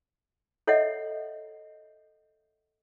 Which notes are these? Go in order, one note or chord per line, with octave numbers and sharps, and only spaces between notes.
A4 C#5 D#5 E5 F#5